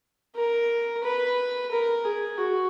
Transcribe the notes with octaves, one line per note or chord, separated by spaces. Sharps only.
A#4
B4
A#4
G#4
F#4